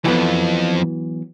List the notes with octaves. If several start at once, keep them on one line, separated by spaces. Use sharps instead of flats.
C2 F2 E3 F#3 B3